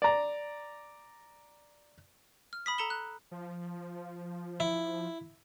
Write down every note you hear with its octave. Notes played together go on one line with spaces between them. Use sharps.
D5 A#5
F6
B5 D#6 B6
A4 A#5 C#7 E7 G7
F#6
F3
E4